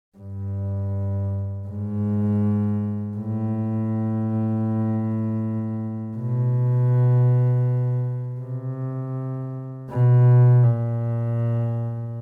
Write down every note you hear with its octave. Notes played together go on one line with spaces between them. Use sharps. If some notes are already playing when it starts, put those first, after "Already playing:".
G2
G#2
A2
B2
C3
B2
A#2